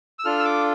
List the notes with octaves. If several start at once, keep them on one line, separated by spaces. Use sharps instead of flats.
E6
D4 F4 A4 F6
E6
D6